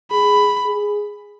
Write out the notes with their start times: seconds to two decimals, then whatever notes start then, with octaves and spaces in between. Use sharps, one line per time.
0.11 G#4 B5
0.66 G#4